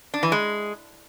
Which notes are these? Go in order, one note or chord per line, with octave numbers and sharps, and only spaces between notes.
D4
E3
G#3